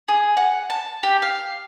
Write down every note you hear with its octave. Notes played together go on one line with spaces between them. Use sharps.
G#4
F#5
A5
G4
F5